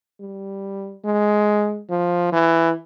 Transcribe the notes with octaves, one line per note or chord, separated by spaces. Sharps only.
G3
G#3
F3
E3